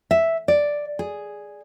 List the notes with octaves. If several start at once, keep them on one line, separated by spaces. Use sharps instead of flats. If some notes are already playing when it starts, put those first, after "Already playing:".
E5
D5
G#4